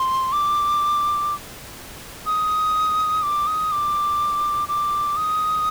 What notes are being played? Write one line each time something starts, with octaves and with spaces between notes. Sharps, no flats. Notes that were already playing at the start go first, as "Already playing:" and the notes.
Already playing: C6
D6
D#6
D6
D#6
D6
D6
D#6